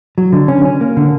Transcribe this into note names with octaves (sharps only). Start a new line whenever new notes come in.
F#3
D3
C#4
C#4
A#3
D3